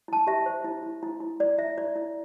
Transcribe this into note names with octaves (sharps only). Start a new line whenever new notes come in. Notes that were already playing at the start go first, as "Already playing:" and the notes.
E4 A5
G4 E5
C5
E4
E4
E4
E4
E4 D5
E4 E5
E4 D5
E4